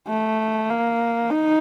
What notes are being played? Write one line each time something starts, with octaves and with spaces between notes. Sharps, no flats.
A3
A#3
D#4